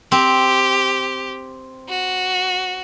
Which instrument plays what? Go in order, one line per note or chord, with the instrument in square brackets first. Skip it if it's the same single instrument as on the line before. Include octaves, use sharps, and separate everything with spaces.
[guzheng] C4 [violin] G4
[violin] F#4